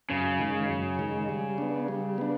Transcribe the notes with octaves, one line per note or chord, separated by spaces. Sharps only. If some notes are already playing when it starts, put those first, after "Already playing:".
F#2 C#3
D#3 G#3
F#2
D#3 G#3
G3
B3 D4
G3
B3 D4